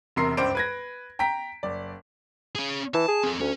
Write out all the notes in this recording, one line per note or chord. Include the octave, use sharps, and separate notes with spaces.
E1 C3 A#4 C6 C7
C#2 G2 D4 C5 D7
B4 G#6 A#6
G5 A#5 B6 D7
F#1 D5
C#4 G#4
E3 A5
G#4
C4 A4
D2 C#4